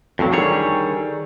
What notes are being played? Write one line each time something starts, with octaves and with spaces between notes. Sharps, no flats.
F2 A2 F#3
D3 D#3 G3 G#4 C#5